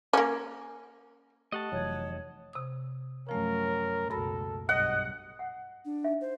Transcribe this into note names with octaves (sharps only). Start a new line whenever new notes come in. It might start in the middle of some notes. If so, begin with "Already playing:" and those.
A#3 C#4
A3 G4 D#5 F#5 A5 C#6
F1 E3 F#3 C#5
C3 D#6
F#2 F3 A3 C#4 A#4
C#2 F#2 B2 A4 B5 A#6
B1 G2 D#5 F#5
F#5
D4
D#4 E5 F5
C5